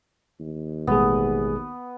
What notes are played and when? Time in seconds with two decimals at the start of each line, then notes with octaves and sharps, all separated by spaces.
0.40 D#2
0.87 A1 B2 G#3 A3 B3 G#4